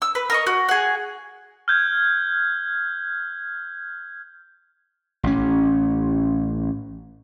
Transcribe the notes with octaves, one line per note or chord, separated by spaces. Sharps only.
E6
B4
A#4 D#5 C#6
F#4
G#4 F#5
F6 G6 G#6
A1 C#4